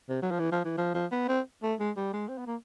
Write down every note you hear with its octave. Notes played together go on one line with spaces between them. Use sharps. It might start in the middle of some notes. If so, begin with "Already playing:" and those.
C3
F#3
F3
E3
F3
E3
F3
F3
B3
C4
A3
G#3
G3
G#3
C4
B3
A#3